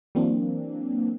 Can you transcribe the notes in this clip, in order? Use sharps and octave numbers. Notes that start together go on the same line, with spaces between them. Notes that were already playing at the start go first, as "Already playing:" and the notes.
E3 F#3 A#3 C4 D4